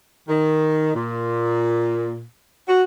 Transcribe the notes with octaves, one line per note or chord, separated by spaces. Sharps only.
D#3
A#2
F#4